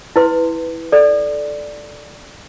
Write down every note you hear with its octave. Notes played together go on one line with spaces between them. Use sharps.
E4 B4 C6
A4 D5